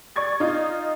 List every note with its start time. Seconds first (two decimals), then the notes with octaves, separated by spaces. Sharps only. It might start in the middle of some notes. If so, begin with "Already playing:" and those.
0.16 D5 C#6 G#6 A6
0.40 D#4 F4